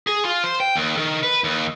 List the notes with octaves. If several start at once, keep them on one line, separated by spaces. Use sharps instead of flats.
G#4
F4
C5
G5
D#2
D#3
B4
D#2